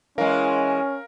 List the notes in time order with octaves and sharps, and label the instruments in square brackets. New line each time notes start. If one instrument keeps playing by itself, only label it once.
[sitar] E3 G#3 [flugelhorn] C#4 [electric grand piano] A#4 F5